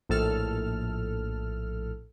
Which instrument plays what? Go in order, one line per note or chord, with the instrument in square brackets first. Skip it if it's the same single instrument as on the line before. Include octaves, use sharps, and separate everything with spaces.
[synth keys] A#1 A2 A4 F6